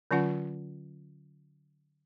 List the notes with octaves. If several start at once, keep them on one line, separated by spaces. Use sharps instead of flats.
D3 F#3 C#4 F4 F#5